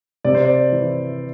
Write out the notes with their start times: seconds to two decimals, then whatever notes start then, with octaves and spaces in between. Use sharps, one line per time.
0.25 C3 D5
0.35 C5
0.45 D5
0.72 E3